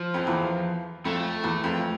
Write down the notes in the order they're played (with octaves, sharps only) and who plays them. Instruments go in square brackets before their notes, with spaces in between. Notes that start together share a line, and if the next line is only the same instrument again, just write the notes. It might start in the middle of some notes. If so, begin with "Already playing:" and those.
Already playing: [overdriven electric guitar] F3
[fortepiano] F2
E2
[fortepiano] F2 [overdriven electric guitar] A3
[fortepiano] E2
F2